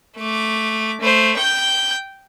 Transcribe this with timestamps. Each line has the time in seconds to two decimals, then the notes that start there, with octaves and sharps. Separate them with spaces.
0.18 A3 D6
1.01 A3 C5
1.37 G5 G6